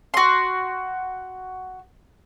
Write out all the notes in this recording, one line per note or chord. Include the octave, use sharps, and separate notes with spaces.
F#4 C6